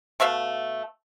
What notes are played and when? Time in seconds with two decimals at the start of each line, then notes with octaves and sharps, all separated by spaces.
0.20 B2 A3 E5 F5